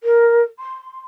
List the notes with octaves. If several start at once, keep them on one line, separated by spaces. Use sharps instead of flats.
A#4
C6